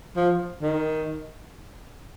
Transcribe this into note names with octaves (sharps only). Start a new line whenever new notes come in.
F3
D#3